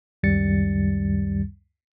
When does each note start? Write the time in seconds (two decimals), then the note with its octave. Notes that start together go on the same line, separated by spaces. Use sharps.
0.23 C#2 F#2 D#3 G3 A6 C#7